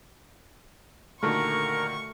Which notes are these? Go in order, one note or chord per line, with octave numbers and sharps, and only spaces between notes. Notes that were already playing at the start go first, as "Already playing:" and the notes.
A#2 D3 D#3 A3 F#4 A#4 C#6